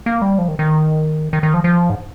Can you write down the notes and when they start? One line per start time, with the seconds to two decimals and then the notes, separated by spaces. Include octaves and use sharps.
0.06 A#3
0.22 G3
0.38 F3
0.48 D#3
0.59 D#3
1.33 D#3
1.43 D#3
1.54 F3
1.64 F3
1.90 G#2